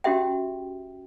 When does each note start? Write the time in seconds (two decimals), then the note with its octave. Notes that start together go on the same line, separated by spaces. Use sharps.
0.04 C#4 F#4 G4 E5 G5